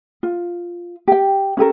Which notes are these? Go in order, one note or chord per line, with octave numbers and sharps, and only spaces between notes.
F4
G4 G5
C#4 G4 A4 A#4